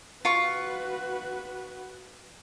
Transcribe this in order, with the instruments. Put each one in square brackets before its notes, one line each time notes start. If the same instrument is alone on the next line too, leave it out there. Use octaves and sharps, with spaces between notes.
[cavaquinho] F4 C#6 [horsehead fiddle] F#4 B4